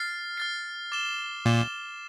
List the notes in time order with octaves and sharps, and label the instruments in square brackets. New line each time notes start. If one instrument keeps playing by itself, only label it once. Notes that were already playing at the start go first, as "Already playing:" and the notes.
Already playing: [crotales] F6 A6 C7
F6 A6 C7
D6 A6 E7 G7
[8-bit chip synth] A#2 [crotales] D6 A6 E7 G7